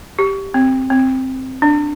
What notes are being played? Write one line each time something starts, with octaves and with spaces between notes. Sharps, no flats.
G4
C4
C4
D4